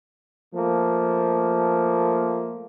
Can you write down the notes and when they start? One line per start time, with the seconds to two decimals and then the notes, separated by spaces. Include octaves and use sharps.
0.54 F3 A3 A#3